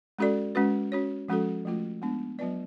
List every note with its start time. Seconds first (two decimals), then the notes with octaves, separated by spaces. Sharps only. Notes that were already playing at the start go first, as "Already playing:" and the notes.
0.19 G#3 C#4 F#4 A4 D5
0.55 G#3 C#4 F#4 B4
0.92 C#4 F#4 C#5
1.28 F3 G#3 C#4 F#4 A4
1.65 F3 A3 F4
2.02 G#3 B3 D4
2.39 F#3 B3 F4 B4 D5